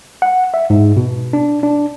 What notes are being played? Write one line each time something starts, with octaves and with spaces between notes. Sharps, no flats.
F#5
E5
G#2
B2
D4
D4